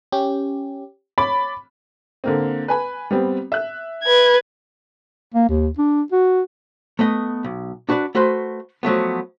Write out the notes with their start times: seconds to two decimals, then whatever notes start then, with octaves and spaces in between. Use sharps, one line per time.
0.12 C#4 G4
1.18 C#5 B5 D6 A6
2.24 D3 A#3 C4
2.68 B4 G#5 B5
3.11 G3 B3 C4
3.52 E5 F#6
4.03 B4 G#6
5.34 A#3
5.49 D#2
5.78 D4
6.12 F#4
6.99 A3 B3 D#5
7.44 B1
7.89 D4 F#4 B4 C#5 D5
8.15 A3 F#4 B4 C5 C6
8.83 F3 F#3 A3 B3